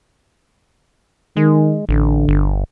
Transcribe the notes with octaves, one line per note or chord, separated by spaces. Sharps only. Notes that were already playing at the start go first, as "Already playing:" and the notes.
D#3 G#3
A1 D3
G1